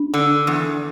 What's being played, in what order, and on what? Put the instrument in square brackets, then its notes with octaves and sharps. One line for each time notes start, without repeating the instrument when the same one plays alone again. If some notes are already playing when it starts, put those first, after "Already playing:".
Already playing: [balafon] D4
[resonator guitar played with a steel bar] D3
E2